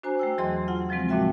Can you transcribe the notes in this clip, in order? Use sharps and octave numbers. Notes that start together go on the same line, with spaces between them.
D4 F#4 C5 G#5 A#5
A3 G5 E6
E2 E3 F#3 G#4 D#5 C6
F4 F#5
C#3 F3 F#3 G#3 C4
A#2 C4 F#4 E5 G5 A5